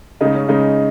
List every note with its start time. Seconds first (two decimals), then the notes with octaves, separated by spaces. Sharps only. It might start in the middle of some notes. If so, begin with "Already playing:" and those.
0.21 C#3 G#3 D#4
0.35 C#4
0.49 C#3 G#3 D#4